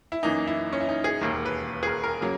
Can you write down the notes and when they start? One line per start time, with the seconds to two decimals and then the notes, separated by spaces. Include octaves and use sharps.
0.12 E4
0.23 F#2 E3 A#3 D#4
0.47 E4
0.73 C#4
0.81 E4
0.89 D#4
1.04 G#4
1.21 E1 D#2 D#3 A#3
1.46 B4
1.83 G#4
1.87 A#4
2.04 A#4
2.21 C#3 F#3 A#3